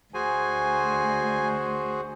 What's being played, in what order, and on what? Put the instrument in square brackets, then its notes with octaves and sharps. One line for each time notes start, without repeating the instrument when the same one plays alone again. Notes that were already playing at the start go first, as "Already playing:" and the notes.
[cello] D2 [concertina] F#4 G#4 C5 [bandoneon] G#5